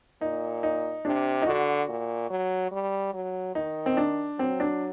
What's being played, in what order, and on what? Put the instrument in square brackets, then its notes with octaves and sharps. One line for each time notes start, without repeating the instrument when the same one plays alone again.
[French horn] A#2 [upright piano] D#4
[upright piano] D#4
[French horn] C3 [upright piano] D4
[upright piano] D#4
[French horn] D3 [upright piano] F#4
[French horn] A#2
F#3
G3
F#3
[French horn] D#3 [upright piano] D#4
[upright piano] C4
D4
[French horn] F#3 [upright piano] C4
[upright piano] D4